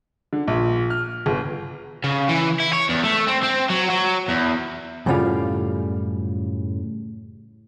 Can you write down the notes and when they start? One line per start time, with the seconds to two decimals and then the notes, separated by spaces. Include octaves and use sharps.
0.33 D3
0.47 A#1
0.90 F6
1.26 G1
2.04 C#3
2.29 E3
2.60 E4
2.73 C#5
2.89 E2
3.04 A3
3.27 C4
3.43 C4
3.69 F#3
3.90 F#3
4.29 E2
5.06 F#2 A2 C#3 G3 F4 F5